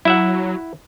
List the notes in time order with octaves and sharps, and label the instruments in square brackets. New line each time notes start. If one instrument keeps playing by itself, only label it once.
[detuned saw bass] F#3 [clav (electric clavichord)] E4 E5 F#5